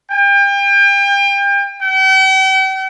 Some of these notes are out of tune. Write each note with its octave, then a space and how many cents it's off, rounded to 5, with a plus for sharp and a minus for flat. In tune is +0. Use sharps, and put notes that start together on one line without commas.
G5 +35
G5 -45